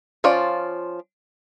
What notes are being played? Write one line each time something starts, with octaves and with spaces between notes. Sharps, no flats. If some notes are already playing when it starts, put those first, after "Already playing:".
F3 C#4 F4 D5